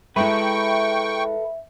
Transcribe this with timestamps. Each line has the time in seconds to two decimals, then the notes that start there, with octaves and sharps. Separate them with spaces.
0.16 G#3 E4 A4 B4 E5 G5 C#6